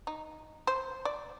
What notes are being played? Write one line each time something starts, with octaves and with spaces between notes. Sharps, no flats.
D#4
C5
D5